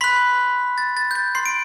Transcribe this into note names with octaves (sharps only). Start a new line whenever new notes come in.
B5 C6 F#6 B6
A6
A6
G6
A6
C6 C7
D7